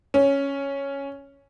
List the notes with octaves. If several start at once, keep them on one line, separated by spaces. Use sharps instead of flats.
C#4